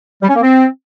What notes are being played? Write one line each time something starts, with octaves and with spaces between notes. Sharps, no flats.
G3
C#4
A#3
C4